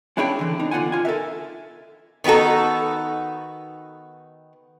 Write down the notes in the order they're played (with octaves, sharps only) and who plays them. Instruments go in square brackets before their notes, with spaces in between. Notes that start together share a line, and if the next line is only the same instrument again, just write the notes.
[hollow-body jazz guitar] C#4 D4 E4 G#4 C#5 G5
D3 E3
D4 D#4
B2 D3 F4 G4 F#5 G#5
F4 G#5
A4 A#4 E5
[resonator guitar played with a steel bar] D#3 B3 D#4 F#4 A4